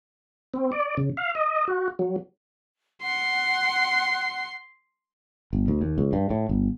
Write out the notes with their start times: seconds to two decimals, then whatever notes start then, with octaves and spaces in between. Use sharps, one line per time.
0.54 C4
0.72 D5
0.97 C#3
1.17 F5
1.35 D#5
1.68 F#4
1.99 F#3
3.03 F#5 C6
5.53 G1
5.68 D2
5.81 D#2
5.98 C#2
6.13 G2
6.30 A2
6.49 G1